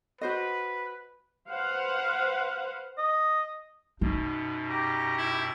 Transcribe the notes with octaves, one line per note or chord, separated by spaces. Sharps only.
F#4 B4 C5 D#5
B4 C5 F5 F#5
D#5
F#2 B2 D#4
G4 A#5
E4